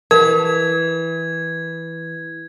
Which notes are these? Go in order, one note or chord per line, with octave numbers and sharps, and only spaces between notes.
E3 A#4 G#6